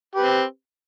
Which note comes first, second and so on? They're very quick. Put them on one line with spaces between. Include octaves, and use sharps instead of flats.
G4 B4 C4